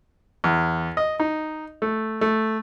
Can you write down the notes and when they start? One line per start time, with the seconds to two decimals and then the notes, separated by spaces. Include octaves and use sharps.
0.44 E2
0.97 D#5
1.20 D#4
1.82 A3
2.21 A3